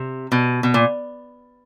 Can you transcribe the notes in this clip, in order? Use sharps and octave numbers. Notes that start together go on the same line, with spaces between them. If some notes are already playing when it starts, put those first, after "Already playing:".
Already playing: C3
B2
B2
A#2